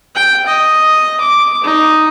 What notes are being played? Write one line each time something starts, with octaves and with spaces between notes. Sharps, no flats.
G5
D#5
D6
D#4